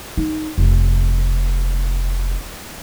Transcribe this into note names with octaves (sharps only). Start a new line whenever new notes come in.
D#4
F1